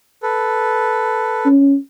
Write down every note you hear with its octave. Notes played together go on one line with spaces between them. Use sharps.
A4 B4
C#4